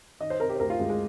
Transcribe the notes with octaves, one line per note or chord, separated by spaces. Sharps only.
D#3 D#5
C5
C3 A#4
G4
C5
D2 A#4
F4
D2 G#3
G#3